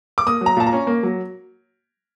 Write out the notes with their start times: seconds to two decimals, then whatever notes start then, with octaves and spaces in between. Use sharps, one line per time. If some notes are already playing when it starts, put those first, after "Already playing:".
0.18 D6
0.27 A#3 D#6
0.41 F#3
0.46 A#5
0.57 A#2 A5
0.67 A#5
0.73 C#4
0.87 A#3
1.03 F#3